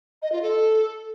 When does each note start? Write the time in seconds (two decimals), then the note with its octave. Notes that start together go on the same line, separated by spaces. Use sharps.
0.22 D#5
0.32 F4
0.42 A4